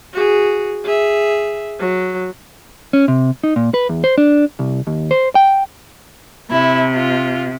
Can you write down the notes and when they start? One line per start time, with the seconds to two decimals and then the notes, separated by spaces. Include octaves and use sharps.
0.13 F#4 G#4
0.84 G#4 E5
1.79 F#3
2.93 C#4
3.08 C3
3.43 D#4
3.56 A#2
3.74 B4
3.89 E2
4.04 C5
4.18 D4
4.59 C2
4.87 D#2
5.11 C5
5.35 G5
6.51 C3 E4
6.96 F4